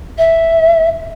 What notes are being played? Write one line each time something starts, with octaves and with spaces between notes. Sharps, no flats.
E5